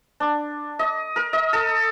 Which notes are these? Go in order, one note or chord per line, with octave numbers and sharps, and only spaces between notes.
D4
D#5
A#4
D#5
A4